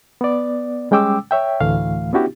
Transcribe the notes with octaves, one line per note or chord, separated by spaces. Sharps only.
B3 D5
G3 G#3 C#4 G5 D6 E6
C#5 E5 G5
D2 A2 E3 A3 F5
B3 C#4 D4 E4 F#4 G4